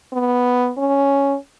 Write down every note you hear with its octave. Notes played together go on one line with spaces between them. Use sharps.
B3
C#4